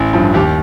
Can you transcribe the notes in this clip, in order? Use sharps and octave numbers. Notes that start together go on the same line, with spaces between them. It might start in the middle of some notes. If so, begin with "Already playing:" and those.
Already playing: A1
G2 F3
D#2 G4